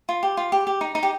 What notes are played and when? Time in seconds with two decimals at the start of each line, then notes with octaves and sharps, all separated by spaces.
0.09 F4
0.23 G4
0.37 F4
0.52 G4
0.67 G4
0.81 D#4
0.95 D#4
1.03 G4